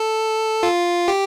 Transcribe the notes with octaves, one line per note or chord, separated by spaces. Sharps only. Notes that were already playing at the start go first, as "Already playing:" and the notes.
Already playing: A4
F4
G4